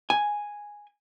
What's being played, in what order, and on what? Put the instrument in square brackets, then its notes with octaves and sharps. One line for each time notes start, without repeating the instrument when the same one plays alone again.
[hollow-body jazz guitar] G#5